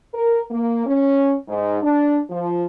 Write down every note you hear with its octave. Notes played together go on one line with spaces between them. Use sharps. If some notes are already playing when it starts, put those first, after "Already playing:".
A#4
A#3
C#4
G#2
D4
F3